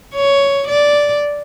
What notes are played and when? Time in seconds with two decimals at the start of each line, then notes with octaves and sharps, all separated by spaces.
0.15 C#5
0.68 D5